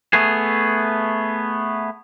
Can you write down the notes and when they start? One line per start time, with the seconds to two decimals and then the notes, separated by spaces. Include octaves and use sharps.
0.13 A3 B3 G#4